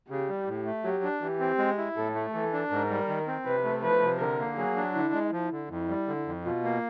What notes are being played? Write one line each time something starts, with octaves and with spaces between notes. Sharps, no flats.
C#3 G4
G3
A2
A3
F#3 G4
D4
E3 G4
C4
G#3
E4
A2 A4
A3
E3 A4
D4
G#2 A#4
G3
D#3
C4
C3 B4
A3
F3 B4
C3
D3 A#4
A#3
F#3 G#4
D4
D3 E4
G#3
F3
D3
F2 E4
G3
D3
F2
B2 F4
A#3